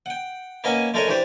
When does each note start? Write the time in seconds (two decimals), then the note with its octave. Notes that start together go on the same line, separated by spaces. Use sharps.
0.06 F#5 G5
0.64 A#3 B3 C#4 D#5 G#5
0.94 G#3 A3 D4 A#4 C#5 D#5
1.07 E3 D4 G4 C5 D5